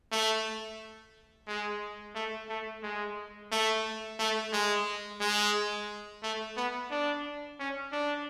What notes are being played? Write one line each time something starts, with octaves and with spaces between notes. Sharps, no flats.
A3
G#3
A3
A3
G#3
A3
A3
G#3
G#3
A3
B3
D4
C#4
D4